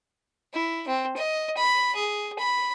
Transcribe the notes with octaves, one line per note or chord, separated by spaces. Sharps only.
E4
C4
D#5
B5
G#4
B5